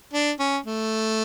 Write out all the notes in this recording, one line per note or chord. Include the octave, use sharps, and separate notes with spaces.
D4
C#4
A3